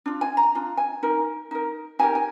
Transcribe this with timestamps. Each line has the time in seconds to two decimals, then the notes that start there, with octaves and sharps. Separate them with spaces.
0.06 D4 F4
0.21 G#5
0.37 A#5
0.55 D4 F4
0.77 G#5
1.03 D#4 A#4
1.51 D#4 A#4
1.99 D#4 G4 A#4 G#5
2.15 G#5